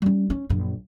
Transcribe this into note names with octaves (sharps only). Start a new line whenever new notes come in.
G3 C#4
C#4
A#1 F#2